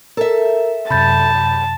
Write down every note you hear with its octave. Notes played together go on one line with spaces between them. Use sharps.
A4 A#4 E5
F#2 C3 A5 B5 G6 A6